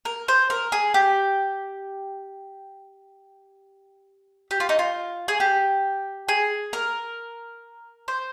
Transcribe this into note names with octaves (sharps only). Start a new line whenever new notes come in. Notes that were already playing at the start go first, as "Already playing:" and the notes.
A#4
C5
A#4
G#4
G4
G4
F4
D#4
F4
G#4
G4
G#4
A#4
C5